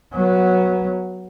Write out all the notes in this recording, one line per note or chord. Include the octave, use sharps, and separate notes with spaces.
F#3 B3